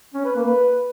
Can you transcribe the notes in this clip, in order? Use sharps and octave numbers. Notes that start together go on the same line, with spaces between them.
C#4
B4
A#3
B4